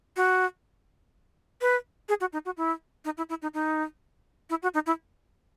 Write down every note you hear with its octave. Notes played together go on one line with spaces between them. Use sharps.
F#4
B4
G#4
F#4
D#4
F#4
E4
D#4
E4
E4
D#4
D#4
E4
F#4
D#4
E4